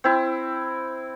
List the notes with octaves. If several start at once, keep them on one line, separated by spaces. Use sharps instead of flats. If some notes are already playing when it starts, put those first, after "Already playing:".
C4 E4